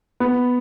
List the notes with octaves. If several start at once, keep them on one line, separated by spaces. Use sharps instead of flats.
B3